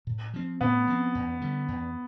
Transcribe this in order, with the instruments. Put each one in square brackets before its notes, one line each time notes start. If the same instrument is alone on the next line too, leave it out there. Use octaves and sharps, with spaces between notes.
[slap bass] A2
F3 C4
[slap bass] A2 [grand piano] B3
[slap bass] F3 C4
E2
D3 G3
E2